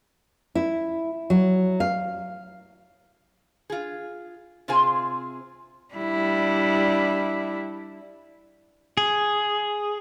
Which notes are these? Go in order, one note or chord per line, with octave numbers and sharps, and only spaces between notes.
E4
F#3
F5
F4 G#4
C3 C4 F4 G#4 C5 G#5
G3 D4 E4
G#4